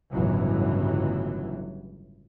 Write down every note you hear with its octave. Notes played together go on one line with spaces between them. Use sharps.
G1 C#2 A2 E3 F#3